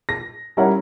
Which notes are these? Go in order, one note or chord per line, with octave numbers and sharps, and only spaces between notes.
A#6
G3 C#4 E4 A#4 C#5 F#5